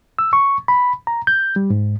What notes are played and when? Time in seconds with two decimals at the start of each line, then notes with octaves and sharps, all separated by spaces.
0.19 E6
0.33 C#6
0.68 B5
1.07 A#5
1.27 G6
1.56 G3
1.70 G#2